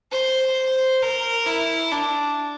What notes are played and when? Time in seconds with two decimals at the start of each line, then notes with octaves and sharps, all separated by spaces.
0.12 C5
1.02 A#4
1.46 E4
1.92 D4